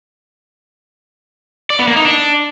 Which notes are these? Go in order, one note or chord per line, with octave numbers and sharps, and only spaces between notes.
D5
B3
A#3
D#4
D4